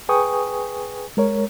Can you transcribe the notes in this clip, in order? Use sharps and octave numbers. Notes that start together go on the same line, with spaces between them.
G#4 B4 G5 G#5 C#6 D#6
G#3 A#4 C#5